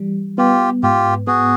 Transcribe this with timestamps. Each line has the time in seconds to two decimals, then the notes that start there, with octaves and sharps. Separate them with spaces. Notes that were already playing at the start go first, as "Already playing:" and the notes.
Already playing: E3 G3
0.38 B3 F4 G4
0.83 G#2 F4 G4
1.27 B3 F#4 G#4